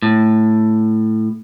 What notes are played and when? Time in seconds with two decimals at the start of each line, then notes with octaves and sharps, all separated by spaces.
0.02 A2